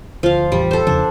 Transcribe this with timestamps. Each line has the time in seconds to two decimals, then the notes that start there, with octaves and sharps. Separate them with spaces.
0.23 D2 F3 F5
0.52 A1 E2 G3
0.71 A4 C5
0.87 E2 C#3 F3 D4